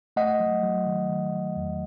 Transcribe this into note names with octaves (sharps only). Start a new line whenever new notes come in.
A3 D#5 F#5
F#3
F#3
D#3
D#3
D#3
E2